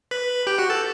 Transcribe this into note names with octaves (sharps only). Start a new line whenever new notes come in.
B4 B5
G4 G5
F#4 F#5
A4 A5